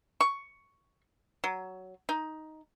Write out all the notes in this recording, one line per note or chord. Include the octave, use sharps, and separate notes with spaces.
C#6
F#3
D#4